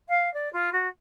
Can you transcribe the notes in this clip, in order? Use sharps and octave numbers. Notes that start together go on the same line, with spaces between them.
F5
D5
F4
F#4